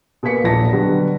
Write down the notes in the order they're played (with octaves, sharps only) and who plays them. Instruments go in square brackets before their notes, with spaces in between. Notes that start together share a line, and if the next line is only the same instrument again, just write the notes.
[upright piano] B2 A#3 G#5 B6 C#7
D#1 A#1 A5 A#6
B2 D3 F#3 G3